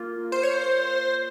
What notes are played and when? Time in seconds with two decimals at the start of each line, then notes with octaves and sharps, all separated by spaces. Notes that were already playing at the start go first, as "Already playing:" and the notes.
Already playing: A#3 F4
0.32 C5
0.43 C#5
0.54 C5